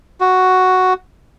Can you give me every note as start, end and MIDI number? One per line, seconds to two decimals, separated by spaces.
0.20 0.93 66